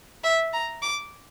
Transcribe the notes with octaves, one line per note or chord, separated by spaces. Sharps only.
E5
A#5
D6